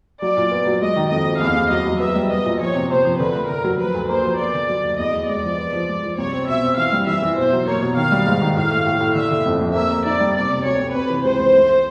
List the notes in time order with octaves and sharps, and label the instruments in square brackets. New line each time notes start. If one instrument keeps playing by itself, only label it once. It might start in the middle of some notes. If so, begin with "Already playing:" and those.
[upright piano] F#3 [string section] D5
[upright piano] A#2
B3
F#3
[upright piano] G#3 [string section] D#5
[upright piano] D#3
[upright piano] F2 [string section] D#5
[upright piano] F2
[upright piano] E2 [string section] F5
[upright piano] E2
[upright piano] F#3 [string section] D#5
[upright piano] F#3
[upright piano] B3 [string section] E5
[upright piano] G3
[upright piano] B3 [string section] D#5
[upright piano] A#2
[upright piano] F3 [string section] C#5
[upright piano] C3
[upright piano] C3 [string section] C5
[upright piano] F3
[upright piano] D3 [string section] B4
[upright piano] A3
[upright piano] D3 [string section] A#4
[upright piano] F#3
[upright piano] F3 [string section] B4
[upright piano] D2
[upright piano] A#3 [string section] C5
[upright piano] F3
[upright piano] B3 [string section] D5
[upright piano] D3
F#3
D#2
[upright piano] E2 [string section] D#5
[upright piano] E2
[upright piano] G#3 [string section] D5
[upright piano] F3
B3
F3
G#3
F3
[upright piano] C2 [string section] C#5
[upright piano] C4
[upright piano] B2 [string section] E5
[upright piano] C4
[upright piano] E3 [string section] F5
[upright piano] G3
[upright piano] E3 [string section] E5
[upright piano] E3
[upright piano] B2 [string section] C5
[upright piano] F#3
[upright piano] A#3 [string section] C#5
[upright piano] B2
[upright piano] D#3 [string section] F5
[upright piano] G3
G#2
D#3
[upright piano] A2 [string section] F5
[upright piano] A3
A2
A2
[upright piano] D3 [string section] E5
[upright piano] D3
F2
F2
[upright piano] A#3 [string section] E5
[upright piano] A#3
[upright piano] D#4 [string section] D5
[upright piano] G3
[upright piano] C3 [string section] D5
[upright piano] C3
[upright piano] D2 [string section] C#5
[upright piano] C3
[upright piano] C3 [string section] B4
[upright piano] E3
[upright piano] C#2 [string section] C5
[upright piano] C#2
A3